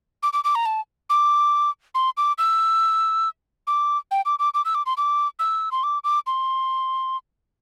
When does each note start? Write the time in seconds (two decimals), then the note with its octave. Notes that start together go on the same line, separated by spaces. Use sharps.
0.23 D6
0.33 D6
0.44 D6
0.55 A#5
0.66 A5
1.10 D6
1.95 C6
2.17 D6
2.38 E6
3.67 D6
4.11 G5
4.26 D6
4.39 D6
4.54 D6
4.65 E6
4.75 D6
4.86 C6
4.97 D6
5.39 E6
5.72 C6
5.83 D6
6.04 D6
6.27 C6